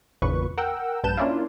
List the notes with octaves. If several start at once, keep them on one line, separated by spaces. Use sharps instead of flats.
G#1 E2 A#2 C#3 B4 C#6
A#4 F#5 G5 E6
A#1 G2 B4 A5 G6 E7
A#3 C#4 D4 E4 F4